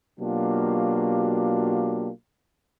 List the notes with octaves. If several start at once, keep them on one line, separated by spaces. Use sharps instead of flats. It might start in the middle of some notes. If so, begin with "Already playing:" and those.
B2 F#3 A#3 D4 F4 G4